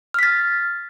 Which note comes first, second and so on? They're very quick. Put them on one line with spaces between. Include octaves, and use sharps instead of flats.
F6 B6 A6